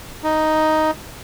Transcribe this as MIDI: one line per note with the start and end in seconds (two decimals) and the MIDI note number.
0.24 0.91 63